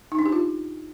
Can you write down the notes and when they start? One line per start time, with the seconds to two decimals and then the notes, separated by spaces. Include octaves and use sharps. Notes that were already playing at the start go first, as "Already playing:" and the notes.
0.12 D#4
0.19 D4
0.26 G4
0.33 F4